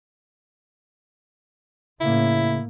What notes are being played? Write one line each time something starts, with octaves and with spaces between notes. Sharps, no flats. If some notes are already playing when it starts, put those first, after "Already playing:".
A2 C#3 A#3 E4